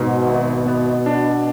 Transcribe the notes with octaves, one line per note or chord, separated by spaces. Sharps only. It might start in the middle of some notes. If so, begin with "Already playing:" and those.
Already playing: G#2 B2
G#1
B3
D4